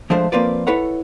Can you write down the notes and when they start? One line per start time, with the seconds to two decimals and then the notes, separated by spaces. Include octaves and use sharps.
0.10 F3 G#3 A3 D4 C5
0.32 F3 A#3 C4 F4 B4 D5
0.67 E4 A4 B4 C#5 F#5